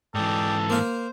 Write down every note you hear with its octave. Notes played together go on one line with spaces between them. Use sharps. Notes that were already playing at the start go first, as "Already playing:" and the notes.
G#2 E3 A4 D5 G5 D#6
A#3 C5 F5